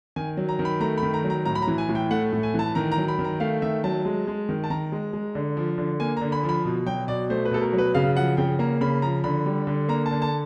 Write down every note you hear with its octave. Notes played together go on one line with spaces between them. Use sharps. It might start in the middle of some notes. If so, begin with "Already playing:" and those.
D#3 G#5
F#3
A#5
D#3
B5
A3 A#5
B5
D#3
A#5
F#3
A#5
A2 A#5
B5
A#5
E3
G#5
A2
G5
A3 F#5
A2
G#5
E3 A5
D#3 A#5
A#5
F#3
B5
D#3
A#5
A3 F5
D#3 E5
F#3 A5
G#3
G#3
D#3
A5
D#3 A#5
G#3
G#3
D3
F3
D3
A#3 G#5
D3 A#5
B5
F3
B5
B2
F#3 G5
B2 D5
A3 C5
B4
B2 A4
A#4
F#3
B4
C#3 F5
F3 F#5
C#3 G5
A#3 A#5
C#3 B5
F3 A#5
D3 B5
G3
D3
A#3 A#5
D3 A5
A5